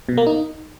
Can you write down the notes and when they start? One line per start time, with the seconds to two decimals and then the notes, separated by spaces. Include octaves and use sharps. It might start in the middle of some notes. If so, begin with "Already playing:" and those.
0.09 B2
0.18 A#3
0.26 D#4